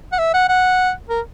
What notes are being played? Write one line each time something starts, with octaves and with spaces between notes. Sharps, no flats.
F#5
E5
F#5
F#5
A#4